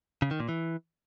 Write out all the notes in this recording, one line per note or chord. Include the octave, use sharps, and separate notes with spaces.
C#3
D#3
A#2
E3